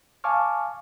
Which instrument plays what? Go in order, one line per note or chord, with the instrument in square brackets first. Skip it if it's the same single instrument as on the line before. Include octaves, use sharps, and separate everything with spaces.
[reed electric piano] F5 G#5 A5 C#6 D6 F6